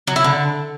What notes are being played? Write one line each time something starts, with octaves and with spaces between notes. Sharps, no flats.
F#3
E4
D3